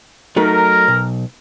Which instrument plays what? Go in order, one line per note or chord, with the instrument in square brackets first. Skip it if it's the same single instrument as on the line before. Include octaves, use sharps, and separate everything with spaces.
[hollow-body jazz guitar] F#3 A3 D#4 [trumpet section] A#4
[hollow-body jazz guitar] B1